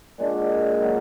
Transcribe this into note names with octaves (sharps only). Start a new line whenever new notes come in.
A#2 G#3 D4 F#4
D#3 F#3 A#3 F4